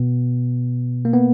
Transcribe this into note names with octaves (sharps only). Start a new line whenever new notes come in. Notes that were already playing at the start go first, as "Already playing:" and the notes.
Already playing: B2 B3
A#3
B3